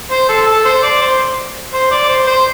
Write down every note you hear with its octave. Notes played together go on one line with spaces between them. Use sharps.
C5
A4
A4
C5
D5
C5
C5
D5
C5
C5